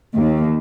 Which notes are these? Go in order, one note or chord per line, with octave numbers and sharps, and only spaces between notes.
D#2